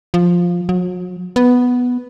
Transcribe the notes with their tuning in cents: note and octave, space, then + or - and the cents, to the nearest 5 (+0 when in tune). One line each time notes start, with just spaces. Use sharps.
F3 +5
F#3 -40
B3 +0